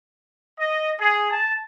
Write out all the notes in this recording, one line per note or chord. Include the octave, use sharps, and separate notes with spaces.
D#5
G#4
A5